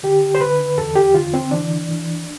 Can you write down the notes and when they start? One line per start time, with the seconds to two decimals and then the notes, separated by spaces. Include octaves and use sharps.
0.03 D3 G4
0.35 C5
0.40 D3 B4
0.78 E2 A4
0.96 G4
1.14 D3 F4
1.34 C4
1.51 E3 D4
1.89 E3